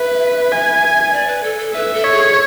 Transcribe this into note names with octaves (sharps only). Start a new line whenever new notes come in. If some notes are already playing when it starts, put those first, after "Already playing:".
Already playing: B4 E5
G#5
D5
B4
A4
A4
B4 E5
A4
C#5
G#4